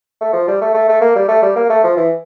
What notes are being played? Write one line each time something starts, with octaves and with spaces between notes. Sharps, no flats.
A3
F3
G3
A3
A3
A3
A#3
G3
A3
G3
A#3
A3
F3
E3